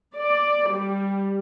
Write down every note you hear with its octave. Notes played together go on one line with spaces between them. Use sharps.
D5
G3